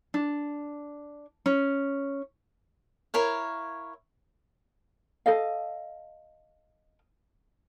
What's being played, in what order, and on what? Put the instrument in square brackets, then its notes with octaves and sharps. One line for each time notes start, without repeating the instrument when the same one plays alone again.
[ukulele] D4
C#4
[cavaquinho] E4 A#4 C#5 F5
[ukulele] A4 D#5 F5